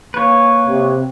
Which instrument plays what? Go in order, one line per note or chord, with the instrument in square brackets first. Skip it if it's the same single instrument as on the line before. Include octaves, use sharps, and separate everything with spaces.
[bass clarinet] A#3 [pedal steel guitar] B4 C#5
[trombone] C3